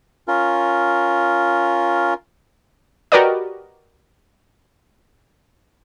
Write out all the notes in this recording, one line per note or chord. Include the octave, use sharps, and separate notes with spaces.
C#4 F4 A#4
F#4 G4 A#4 B4 D5 D#5